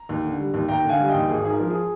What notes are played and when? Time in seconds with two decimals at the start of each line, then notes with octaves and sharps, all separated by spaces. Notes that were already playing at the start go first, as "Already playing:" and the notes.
Already playing: A#5
0.09 D#2
0.24 D3
0.39 G3
0.54 D#2
0.69 D#2 G5 A#5
0.85 D3 F5 G#5
1.00 G3 G#5
1.09 D#5 G5
1.14 D#2
1.29 G#1 G#4
1.45 G#2 G#4
1.50 A#4
1.59 F3
1.70 G#4